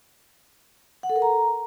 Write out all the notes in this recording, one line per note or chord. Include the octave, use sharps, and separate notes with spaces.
F#5
A4
A#4
A#5